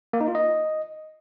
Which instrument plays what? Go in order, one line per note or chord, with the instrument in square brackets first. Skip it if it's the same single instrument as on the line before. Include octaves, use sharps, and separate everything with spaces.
[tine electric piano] A#3
D#4
F4
D#5